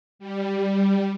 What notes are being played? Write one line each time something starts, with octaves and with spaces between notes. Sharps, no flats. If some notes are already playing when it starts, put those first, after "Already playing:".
G3